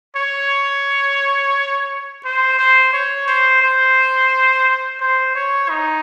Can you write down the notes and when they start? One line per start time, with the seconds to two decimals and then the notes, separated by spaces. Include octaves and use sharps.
0.16 C#5
2.24 C5
2.59 C5
2.93 C#5
3.28 C5
3.62 C5
5.00 C5
5.35 C#5
5.69 D#4